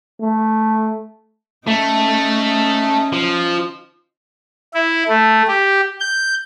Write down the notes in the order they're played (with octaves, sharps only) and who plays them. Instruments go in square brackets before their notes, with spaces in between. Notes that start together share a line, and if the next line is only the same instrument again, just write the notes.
[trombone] A3
[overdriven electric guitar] A3 [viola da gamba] C#4 D#4
[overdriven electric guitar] F3
[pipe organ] E4
A3
G4
G6